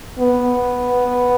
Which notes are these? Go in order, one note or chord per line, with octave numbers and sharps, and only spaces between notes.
B3